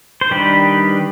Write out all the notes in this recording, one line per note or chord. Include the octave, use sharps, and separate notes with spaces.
C5
D#3 G3 D4 G4 B4